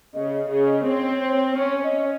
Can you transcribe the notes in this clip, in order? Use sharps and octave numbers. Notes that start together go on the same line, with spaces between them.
C#3 D#5
C#3
C4 C#5
C#4 C#5
D#5